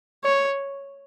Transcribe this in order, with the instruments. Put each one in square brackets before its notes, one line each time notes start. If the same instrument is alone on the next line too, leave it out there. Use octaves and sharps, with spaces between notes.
[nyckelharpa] C#5